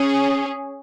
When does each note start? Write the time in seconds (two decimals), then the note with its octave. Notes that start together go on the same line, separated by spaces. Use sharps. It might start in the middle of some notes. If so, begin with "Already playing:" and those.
Already playing: C#4 G#4